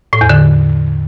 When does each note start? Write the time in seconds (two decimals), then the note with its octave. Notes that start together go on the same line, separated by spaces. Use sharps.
0.13 A2
0.21 E2
0.29 D3